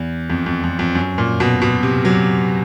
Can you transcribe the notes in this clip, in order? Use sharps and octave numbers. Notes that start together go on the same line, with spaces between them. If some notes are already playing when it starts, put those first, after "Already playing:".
Already playing: E2
F2
F2
F2
F2
F#2
A#2
B2
B2
C3
F#3